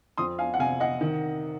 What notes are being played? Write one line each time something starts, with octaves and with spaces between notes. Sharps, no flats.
F2 C6 D#6
F5 G#5
F#5
C3 F5 G#5
D#5 F#5
D#3